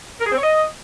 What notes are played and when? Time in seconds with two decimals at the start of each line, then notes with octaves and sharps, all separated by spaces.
0.21 A#4
0.26 G#4
0.32 C4
0.37 C#5
0.43 D#5